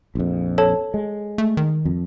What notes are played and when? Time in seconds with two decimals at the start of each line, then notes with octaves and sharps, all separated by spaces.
0.15 A#1 F2
0.58 A4 C#5 A5
0.94 G#3
1.38 A3
1.57 D#3
1.85 F2